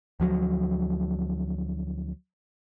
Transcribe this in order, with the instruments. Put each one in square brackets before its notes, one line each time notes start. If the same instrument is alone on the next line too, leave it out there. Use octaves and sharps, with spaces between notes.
[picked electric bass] D2 F3 F#3